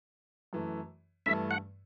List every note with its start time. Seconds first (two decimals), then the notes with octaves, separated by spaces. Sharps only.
0.53 F#2 E3 A3
1.26 G2 E3 A3 E5
1.51 F#5